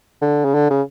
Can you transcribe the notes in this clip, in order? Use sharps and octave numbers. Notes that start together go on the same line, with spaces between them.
D3
C#3
D3
C#3